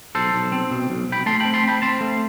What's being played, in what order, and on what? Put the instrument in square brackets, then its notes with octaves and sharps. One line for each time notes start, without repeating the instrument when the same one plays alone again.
[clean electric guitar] B1 A4 C5
B1
C4
B2
B1
B1 G5 B5
A3 A5 C6
C4 G5 B5
A5 C6
C4 G5 B5
C4 A5 C6
A3